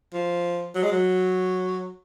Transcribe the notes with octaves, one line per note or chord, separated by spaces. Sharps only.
F3
F#3
G#3
F#3